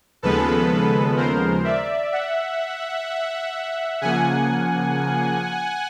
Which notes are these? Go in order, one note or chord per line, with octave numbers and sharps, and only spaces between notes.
D#2 C#3 F3 G#3 B3 A4 B4
A#4 C5
D5 E5
E5 F#5
C#3 F3 A#3 F#5 G#5